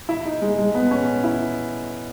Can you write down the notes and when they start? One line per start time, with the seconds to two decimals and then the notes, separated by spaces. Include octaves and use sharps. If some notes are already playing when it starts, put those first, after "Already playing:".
0.09 E4
0.25 D#4
0.42 G#3
0.58 G#3
0.75 B3
0.91 C#4
1.24 E4